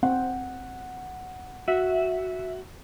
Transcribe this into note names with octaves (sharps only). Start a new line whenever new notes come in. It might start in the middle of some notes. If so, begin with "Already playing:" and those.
C4 F#5
F#4 E5